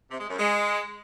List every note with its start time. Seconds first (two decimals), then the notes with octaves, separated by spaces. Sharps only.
0.10 C3
0.20 G#3
0.29 F#2
0.39 G#3